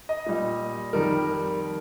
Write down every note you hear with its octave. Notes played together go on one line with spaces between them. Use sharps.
D#5
A#2 G3
F2 D#3 G3 A#4